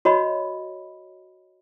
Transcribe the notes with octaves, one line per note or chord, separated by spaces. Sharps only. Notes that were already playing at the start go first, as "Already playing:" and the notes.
F#4 C#5 D#5 B5